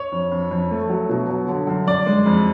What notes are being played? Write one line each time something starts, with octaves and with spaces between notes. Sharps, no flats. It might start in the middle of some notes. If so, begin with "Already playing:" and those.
Already playing: C#5
F2
F2
F2
A3
F#3
B2
F#3
D3
F#2
F#2 D5
G#3
F2